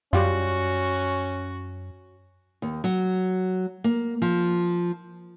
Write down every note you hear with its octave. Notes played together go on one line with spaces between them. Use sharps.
F#2 G3 C#4 F4 F#4
D#2
F#3
A#3
F3